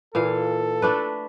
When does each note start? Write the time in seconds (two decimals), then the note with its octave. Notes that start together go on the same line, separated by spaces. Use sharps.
0.15 A#2 E3 A4 F5
0.82 A3 D4 B4